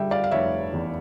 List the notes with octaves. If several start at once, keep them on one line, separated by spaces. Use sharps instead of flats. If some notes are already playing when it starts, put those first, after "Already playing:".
Already playing: D3 G3 E5 G5
D5 F5
F5
F1 C#5 E5
E2